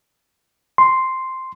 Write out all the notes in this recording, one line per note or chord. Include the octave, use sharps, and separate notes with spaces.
C6